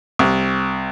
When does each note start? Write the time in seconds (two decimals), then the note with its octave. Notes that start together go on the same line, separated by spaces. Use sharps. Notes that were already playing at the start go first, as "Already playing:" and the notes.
0.19 C2